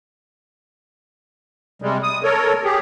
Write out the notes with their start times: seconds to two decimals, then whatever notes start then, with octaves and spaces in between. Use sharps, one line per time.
1.82 C3 G3 G#3
2.03 D#6
2.23 A4 A#4 C#5
2.64 G4 G#4